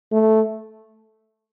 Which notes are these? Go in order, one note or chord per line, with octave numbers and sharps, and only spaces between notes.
A3